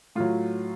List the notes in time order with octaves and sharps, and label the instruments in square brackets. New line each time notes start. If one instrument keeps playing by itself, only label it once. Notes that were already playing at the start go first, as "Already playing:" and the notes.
[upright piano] A2 F#3 F4